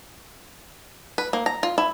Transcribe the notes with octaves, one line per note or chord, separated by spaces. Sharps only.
B4
A#3
A#5
F4
E4